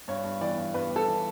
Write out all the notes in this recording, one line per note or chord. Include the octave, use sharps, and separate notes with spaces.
G2 C#5
G2
E3 D5
G2
G2 B4
G2
A4
E3